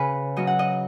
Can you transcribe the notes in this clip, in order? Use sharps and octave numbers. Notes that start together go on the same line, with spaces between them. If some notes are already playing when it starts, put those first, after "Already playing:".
Already playing: C#3 C#4 G#4 B4
F#3 C#4 D#5
F#5
D#5